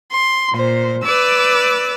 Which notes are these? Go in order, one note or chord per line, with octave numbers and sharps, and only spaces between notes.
C6
A#2 C5
B4 D5 D6 E6